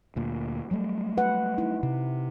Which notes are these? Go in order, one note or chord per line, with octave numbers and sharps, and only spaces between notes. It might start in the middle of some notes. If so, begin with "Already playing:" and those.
D2 A#2
F#3 G3 A3
B4 F#5
D#4 E4
C3